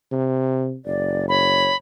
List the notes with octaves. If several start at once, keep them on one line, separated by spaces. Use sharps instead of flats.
C3
F#1 D5
C#5 B5